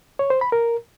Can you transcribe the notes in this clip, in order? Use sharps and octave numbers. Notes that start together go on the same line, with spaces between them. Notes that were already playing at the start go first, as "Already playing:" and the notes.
C#5
C5
B5
A#4